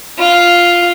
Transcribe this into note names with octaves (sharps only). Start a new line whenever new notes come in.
F4